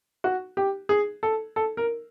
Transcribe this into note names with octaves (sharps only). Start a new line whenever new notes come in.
F#4
G4
G#4
A4
A4
A#4